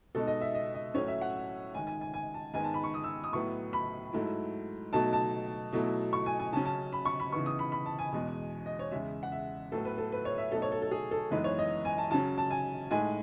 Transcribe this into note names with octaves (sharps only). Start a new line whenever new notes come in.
B2 G#3 D#4 A4
D#5
E5
D#5
D#5
A2 F#3 A3 C#4 C#5
E5
F#5
D#3 G#3 D#4 G#5
G#5
G#5
G#5
A5
G#2 D#3 G#3 B3 G#5
A5
B5
C#6
D#6
E6
D#6
A2 F#3 B3 E4 C#6
B5
G#2 F#3 A3 E4
B2 F#3 A3 D#4 A5
A5
B2 F#3 A3 E4
C#6
G#5
G#5
C#3 F#3 C#4 A5
A5
B5
C#6
B5
C#3 E3 B3 D#4 C#6
D#6
B5
B5
A5
G#5
E2 B2 G#3
D#5
C#5
E2 C#3 G#3 E5
F#5
E5
A2 F#3 B3 A4
B4
A4
B4
C#5
E5
B2 F#3 A3 D#4 A4
C#5
A4
A4
G#4
A4
F#2 E3 G#3 B3 D#4 B4
C#5
D#5
G#5
A5
C#3 F#3 C#4 A5
A5
G#5
A2 G#3 D#4 G#5